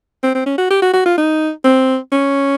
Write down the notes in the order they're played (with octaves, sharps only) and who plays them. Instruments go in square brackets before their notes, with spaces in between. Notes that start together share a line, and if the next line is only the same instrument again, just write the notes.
[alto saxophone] C4
C4
C#4
F#4
G4
F#4
F#4
F4
D#4
C4
C#4